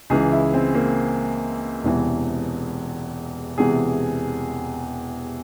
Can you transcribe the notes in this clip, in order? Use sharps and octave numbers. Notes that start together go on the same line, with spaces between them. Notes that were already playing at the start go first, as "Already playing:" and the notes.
C#2 C#3 E3 G#4
E4
C4
A#3
E1 E2 C3 E3
E1 E2 C3 E3 G#4